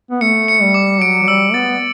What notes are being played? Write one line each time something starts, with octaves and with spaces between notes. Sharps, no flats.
B3
A3 C#7
C#7
G3
D6
F#3 D7
F#3
G3 E6
B3 A6